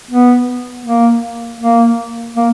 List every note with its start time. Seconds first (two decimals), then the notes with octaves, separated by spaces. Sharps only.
0.11 B3
0.85 A#3
1.60 A#3
2.36 A#3